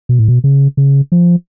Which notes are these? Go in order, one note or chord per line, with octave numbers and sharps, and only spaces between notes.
B2
A2
B2
C#3
C#3
F3